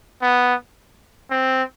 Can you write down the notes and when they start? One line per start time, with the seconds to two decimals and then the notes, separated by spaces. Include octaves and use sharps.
0.22 B3
1.31 C4